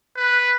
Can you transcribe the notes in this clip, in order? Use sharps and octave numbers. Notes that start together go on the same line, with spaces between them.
B4